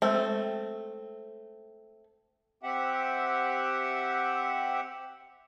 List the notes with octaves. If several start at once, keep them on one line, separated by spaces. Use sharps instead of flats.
G#3 A3 C4
C4 G4 E5 F#5